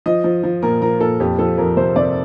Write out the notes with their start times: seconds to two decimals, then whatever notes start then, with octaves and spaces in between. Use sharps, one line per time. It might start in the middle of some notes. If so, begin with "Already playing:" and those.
0.06 F3 D#5
0.24 F3
0.43 F3
0.62 A#2 A#4
0.81 F3 A#4
1.00 A#2 A4
1.20 F2 G4
1.39 F3 A4
1.58 F2 A#4
1.77 C3 C5
1.96 C3 D5